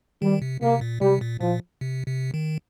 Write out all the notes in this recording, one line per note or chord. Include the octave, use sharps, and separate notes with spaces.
D#3 G3
C3
C3 A#3
A#2
C3 G3
A#2
A#2 F3
C3
C3
D#3